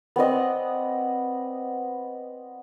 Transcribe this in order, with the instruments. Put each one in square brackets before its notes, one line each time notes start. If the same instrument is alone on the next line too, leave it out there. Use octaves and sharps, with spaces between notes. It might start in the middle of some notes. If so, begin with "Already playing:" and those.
[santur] B3 C4 D5 D#5